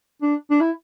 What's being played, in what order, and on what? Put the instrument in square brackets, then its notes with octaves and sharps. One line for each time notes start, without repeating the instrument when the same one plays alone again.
[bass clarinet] D4
D4
E4